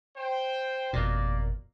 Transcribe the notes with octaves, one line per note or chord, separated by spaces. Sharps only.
C5 G5
G1 F2 B2 A#3 D5